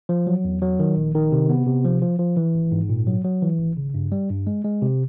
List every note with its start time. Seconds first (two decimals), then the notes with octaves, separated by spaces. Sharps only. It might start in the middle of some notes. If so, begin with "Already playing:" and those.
0.09 F3
0.27 F#3
0.44 E2
0.62 F#3
0.79 D#3
0.97 A#1
1.15 D#3
1.32 C3
1.50 B3
1.67 C3
1.84 F3
2.02 F3
2.19 F3
2.37 E3
2.55 G#1
2.72 G#2
2.89 A#2
3.07 F#3
3.25 F#3
3.42 E3
3.59 G#1
3.77 C#3
3.94 G2
4.12 G3
4.30 G2
4.47 G#3
4.65 G#3
4.82 C3